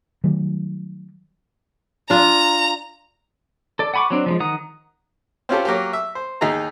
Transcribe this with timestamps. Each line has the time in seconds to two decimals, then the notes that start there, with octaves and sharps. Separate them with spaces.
0.24 D#3 F#3 G3 A3
2.10 D4 F4 A#5
3.79 A4 D5
3.94 F#5 G#5 B5 C#6 D6
4.10 F#3 C4 D4
4.26 F3 G3 G#3
4.40 D#3 F#5 A#5 D#6
5.49 C4 C#4 F4 G4 A4
5.65 F#3 A#3 G4
5.93 E5
6.15 C5
6.41 D#2 D#4 G#4 A#5